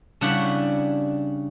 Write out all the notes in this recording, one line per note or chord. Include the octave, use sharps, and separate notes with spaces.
C#3 G3 D4 E4 F#5